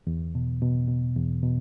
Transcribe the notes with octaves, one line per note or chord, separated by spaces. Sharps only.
E2
B2
B2
B2
E2
B2